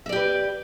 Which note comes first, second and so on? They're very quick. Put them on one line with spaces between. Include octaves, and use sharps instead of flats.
E5 D5 G4 B4